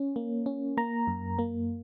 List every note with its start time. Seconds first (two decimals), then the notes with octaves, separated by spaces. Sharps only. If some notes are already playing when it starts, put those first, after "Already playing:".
Already playing: C#4
0.16 A#3
0.46 C#4
0.77 A#3 A#5
1.07 F#2
1.39 A#3